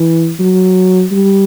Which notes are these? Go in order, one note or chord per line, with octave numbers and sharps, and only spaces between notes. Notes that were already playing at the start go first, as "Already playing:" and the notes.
Already playing: E3
F#3
G3